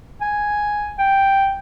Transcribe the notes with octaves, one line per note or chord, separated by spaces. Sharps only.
G#5
G5